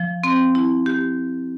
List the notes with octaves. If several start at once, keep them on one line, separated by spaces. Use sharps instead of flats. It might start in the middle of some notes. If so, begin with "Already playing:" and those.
Already playing: F3
C4
E4
G4